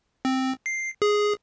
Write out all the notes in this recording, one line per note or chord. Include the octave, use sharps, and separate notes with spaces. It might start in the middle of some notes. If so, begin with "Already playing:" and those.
C4
C7
G#4